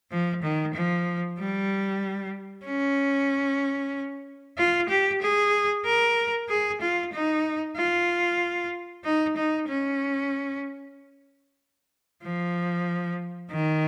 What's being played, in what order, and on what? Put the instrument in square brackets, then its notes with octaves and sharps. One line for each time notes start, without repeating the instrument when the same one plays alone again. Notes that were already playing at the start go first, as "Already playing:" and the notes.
[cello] F3
D#3
F3
G3
C#4
F4
G4
G#4
A#4
G#4
F4
D#4
F4
D#4
D#4
C#4
F3
D#3